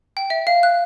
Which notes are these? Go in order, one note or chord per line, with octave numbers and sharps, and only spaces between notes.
G5
E5
F5
F#6